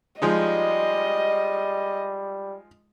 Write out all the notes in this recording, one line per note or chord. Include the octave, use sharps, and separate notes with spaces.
F3 G3 G#3 D#4 D#5